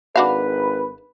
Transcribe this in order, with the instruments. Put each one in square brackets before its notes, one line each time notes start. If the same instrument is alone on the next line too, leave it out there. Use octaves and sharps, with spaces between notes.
[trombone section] G#1 B4 [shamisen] D4 F#4 F5